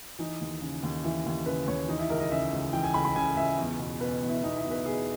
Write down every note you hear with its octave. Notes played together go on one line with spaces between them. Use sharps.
E3 D#4
D#2
C#3
D#2
E3 E4
D#2
C#3 B4
D#2 C#5
E3 D#4
E4
C#2 A#4
D#5
C#3 E5
C#2
E3 G5
G#5
C#2 B5
B5
C#3 G#5
C#2 E5
E2
B2
B2 B4
E2
E4
E2 D#4
E4
B2
B4
B2 G#4